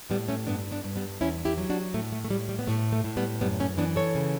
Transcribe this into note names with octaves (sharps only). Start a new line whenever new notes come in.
A2 G3 B3
A3 C#4
G2 B3 D4
B3 D4
G2
G3 B3
E2 C#4 E4
E4 G4
F#3
D4 F#4
A2 A3
A3
A3
A2 G3
G3
B3
A2 A3
A3
A2
G3 B3
F#2 G3 B3
A3 C#4
E3 B3 D4
A4 C#5
C#3